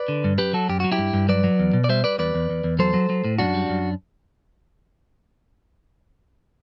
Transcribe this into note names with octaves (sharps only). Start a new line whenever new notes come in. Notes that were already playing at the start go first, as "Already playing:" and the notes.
Already playing: B4 D5
D3
G2
F#2 G4 B4
F#3 F#4 A4
F#2 G4
F#3 F#4
E4 G4
G2
G2
F#3 B4 D5
F#3
E2
B2
D5
G3 C5 E5
G3 B4 D5
E2 B4 D5
E2
E2
E2
F#3 A4 C5
F#3
F#3
A2
F#2 D4 F#4
G3
F#2